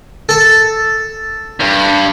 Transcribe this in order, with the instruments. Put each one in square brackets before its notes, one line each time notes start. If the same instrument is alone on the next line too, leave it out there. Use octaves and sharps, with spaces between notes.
[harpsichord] A4
[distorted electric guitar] G2